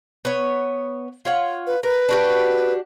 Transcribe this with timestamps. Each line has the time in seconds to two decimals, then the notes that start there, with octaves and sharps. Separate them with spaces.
0.25 B3 C#5
1.25 F4 C#5 F#5
1.67 B4
1.83 A#4 B4
2.09 D4 F#4 G4